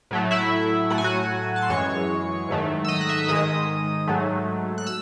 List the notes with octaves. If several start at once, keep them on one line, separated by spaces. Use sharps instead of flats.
A2 F#3 A3
E4 E5
A2 F#3 A3 F#5
G#5
F#4 F#5
A5
C6
F#2 E3 G#3 C#5 C#6
G#2 D#3 F#3 A3
E6
D#5 D#6
F#6
E5 E6
G#2 D#3 G#3 D#5 D#6
G#2 F#3 A3
F#6
E6